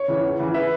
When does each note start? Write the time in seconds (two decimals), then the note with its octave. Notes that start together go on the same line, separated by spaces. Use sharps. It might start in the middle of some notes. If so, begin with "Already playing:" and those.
Already playing: C#5
0.08 C#3 E3
0.23 E2
0.39 C#3 E3
0.54 B4 E5